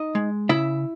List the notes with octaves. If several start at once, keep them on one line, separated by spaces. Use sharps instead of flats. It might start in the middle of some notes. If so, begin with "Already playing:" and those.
Already playing: D#4 D#5
G#3
C#3 E4 E5